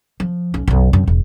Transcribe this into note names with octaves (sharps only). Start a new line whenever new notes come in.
F3
B1 C#4
B1 F#2
F#2 C4
E1